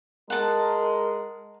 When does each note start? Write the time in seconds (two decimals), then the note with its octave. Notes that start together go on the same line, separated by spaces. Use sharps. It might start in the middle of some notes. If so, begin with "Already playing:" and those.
0.30 G#3 A#4 F#5 A5